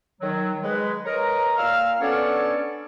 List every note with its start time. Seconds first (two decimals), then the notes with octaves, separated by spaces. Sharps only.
0.20 D#3 F#3
0.63 G#3 B4
1.05 A#4 B4 C#5 D#5 A#5
1.57 A#2 F5 E6 F6
2.01 B3 C#4 D4 A4 C#5 D5